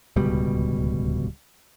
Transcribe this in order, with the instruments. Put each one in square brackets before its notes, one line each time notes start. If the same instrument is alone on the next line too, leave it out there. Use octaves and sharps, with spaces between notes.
[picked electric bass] D1 C#2 B2 G3